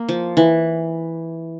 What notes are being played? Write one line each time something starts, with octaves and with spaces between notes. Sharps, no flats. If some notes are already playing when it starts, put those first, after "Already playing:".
Already playing: A#3
F3
E3